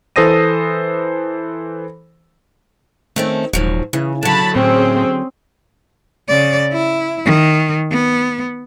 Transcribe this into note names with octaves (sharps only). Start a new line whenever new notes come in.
E3 A4 C5 D#6 A#6 D#7
D#3 A3 C4 C#4
D#1 G#2 F3 F#3
C#3 E3
D3 F#3 A5 B5
A2 C4 C#4 G#4
C#3 D5
E4
D#3
B3